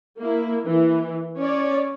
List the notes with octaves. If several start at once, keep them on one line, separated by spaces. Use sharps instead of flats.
A#3 E4
E3
C#4 C#5 D5